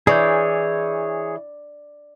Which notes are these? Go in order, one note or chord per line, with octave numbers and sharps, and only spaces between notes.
E3 G#4 C#5 D5 G6